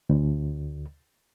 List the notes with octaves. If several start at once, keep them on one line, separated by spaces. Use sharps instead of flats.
D2